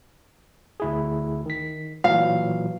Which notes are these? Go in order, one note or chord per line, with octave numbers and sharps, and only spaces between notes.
D2 E4 G#4
D#3 B6
A#2 E3 F#3 F5